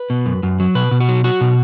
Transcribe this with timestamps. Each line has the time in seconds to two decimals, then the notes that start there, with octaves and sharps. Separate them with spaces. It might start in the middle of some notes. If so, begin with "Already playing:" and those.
Already playing: B4
0.10 B2
0.26 F#2
0.43 F#2
0.60 F#3
0.75 B2 B4
0.91 B2
1.00 F#4
1.08 F#3
1.24 F#3 F#4
1.41 B2